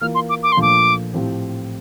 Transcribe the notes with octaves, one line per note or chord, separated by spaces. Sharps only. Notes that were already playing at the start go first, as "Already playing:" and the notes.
E3 A#3 F4 A#4 F6
C6
D6
D6
C6
A#2 F3 A3 D4 D6
A2 F3 C4 G4